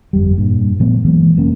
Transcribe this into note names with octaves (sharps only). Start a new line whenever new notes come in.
G1 F2 G3
G2 A#2
A#2 F3 A3 B3
E3 F#3 G#3 A#3
F1 A3 A#3 C#4